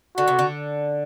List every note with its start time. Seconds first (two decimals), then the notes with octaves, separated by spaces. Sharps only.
0.17 D3 F#4
0.28 C3
0.39 D3